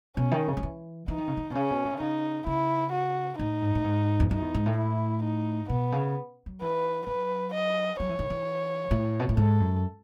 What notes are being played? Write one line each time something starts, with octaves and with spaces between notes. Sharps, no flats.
B2 C#4
D#3
C#3
F#3
E3
E3 D#4
D#3
C#3
D#3
B2
C#3 C#4
B2
A2
D#3
C#3 D#4
C#3 E4
F#4
A2 D#4
G#2
A2
G#2
E2
F#2 D#4
E2
G#2
A2
E4
D#4
B2 B3
C#3
F#3
E3 B4
F#3 B4
D#5
F#3 C#5
E3
D#3
E3
A2
B2
A2
G#2 A4
F#2